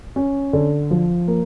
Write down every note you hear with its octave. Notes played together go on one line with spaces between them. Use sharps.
C#4
D3
F3
A#3